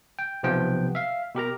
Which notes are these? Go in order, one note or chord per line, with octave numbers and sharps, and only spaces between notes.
G5
B1 C3 F3 B3 G5
E5 F5
B2 G4 A#4 A#5